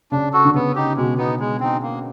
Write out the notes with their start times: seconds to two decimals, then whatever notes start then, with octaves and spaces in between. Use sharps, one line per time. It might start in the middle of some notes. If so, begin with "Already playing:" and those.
0.12 C#3 D4
0.33 F#4 A4
0.45 D3
0.54 C#3 B3
0.76 D#4 G4
0.97 B2 G#3
1.18 B3 D#4
1.40 G#3
1.60 C4 D#4
1.82 A#3